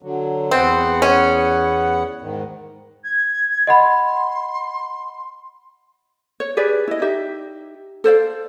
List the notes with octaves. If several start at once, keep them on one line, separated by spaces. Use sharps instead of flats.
D3 F#3
E2 B3 C4 F#5
C#4
G#2 D#3
G#6
D#5 F#5 B5 C6
C#5
G4 G#4 B4 D5
E4 D#5
D#4 G4 E5
A4 C5 D5 F5